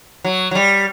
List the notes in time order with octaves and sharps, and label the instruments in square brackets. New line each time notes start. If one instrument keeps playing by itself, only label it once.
[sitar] F#3
F#3
G3